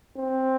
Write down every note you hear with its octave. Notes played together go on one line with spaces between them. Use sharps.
C4